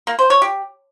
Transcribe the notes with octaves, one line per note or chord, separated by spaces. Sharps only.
A#3
C5
C#5
G4